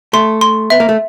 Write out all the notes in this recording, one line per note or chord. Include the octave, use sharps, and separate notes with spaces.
A3 C6
C6
B3 E5
A#3
A3